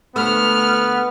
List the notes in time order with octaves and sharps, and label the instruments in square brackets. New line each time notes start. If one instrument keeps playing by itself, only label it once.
[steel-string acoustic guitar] D2 A3 [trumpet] B3 [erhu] F6